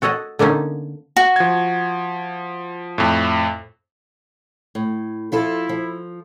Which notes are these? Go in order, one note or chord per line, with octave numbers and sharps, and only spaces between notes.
F#4 A4 C#5 D#5 F#5
D3 A#3 B3 C#4 D#4
F#4
F3 G#6
F2 A2
A2
F3 E4 F4 A4
F3